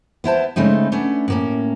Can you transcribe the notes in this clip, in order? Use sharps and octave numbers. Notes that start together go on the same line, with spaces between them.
B3 E4 C5 A5
C#3 G#3 A3 C4 D#4
A3 B3 C#4 D4
A2 A#3 C#4